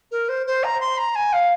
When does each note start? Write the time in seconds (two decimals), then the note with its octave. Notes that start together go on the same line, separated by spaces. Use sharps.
0.11 A#4
0.28 C5
0.46 C5
0.63 A#5
0.80 C6
0.97 A#5
1.15 G#5
1.32 F5